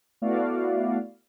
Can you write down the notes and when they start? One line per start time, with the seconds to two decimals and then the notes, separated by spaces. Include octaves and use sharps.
0.22 A3 B3 E4 F#4 D5 F5